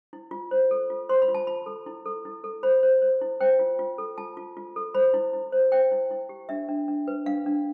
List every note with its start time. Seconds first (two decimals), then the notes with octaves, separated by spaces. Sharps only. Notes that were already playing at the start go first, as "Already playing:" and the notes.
0.13 E4
0.31 F4
0.51 C5
0.71 A4
0.90 F4
1.09 C5 C6
1.22 B5
1.28 F4
1.34 A5
1.47 F4 B5
1.66 A4
1.86 E4
2.06 A4
2.25 E4
2.44 A4
2.63 C5 B5
2.83 C5
3.02 C5
3.21 E4
3.41 C5 G5
3.59 F4
3.79 F4
3.98 A4
4.18 F4 A5
4.37 F4
4.57 F4
4.76 A4
4.94 C5 B5
5.14 E4
5.33 E4
5.52 C5
5.72 C5 G5
5.91 E4
6.11 E4
6.29 G4
6.49 D4 E5
6.68 D4
6.88 D4
7.07 B4
7.26 D4 F5
7.46 D4